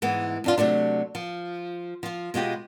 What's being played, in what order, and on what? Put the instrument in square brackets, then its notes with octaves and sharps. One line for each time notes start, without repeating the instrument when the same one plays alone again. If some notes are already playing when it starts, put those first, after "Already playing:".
[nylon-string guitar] G#2 E3 G#3 B3
F2 D4 F4
C3 F#3 A3 D4
F3
F3 F4
B2 G#3 F4 G4